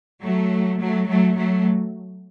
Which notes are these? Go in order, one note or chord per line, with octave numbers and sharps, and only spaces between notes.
F#3 A3
F#3 A3
F#3 A3
F#3 A3